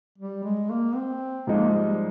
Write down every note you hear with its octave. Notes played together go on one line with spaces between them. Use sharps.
G3
G#3
A#3
C4
G#2 F3 G#3 A#3 D#4
G3